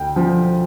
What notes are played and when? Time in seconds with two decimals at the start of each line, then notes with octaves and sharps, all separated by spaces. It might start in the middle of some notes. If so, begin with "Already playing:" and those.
Already playing: D2 G5
0.16 F3